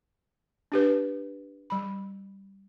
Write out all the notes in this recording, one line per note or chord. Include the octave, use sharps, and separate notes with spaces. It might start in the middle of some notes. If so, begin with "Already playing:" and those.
D4 G4 B4
G3 B5